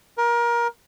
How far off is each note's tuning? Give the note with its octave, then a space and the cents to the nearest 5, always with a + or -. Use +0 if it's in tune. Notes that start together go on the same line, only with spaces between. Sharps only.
A#4 +25